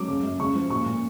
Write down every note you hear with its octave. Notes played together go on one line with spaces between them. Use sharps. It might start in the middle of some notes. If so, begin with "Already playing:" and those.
Already playing: F#3 D6
C#3
F#2
C#3 C#6
F3
A#2 C#6
A#2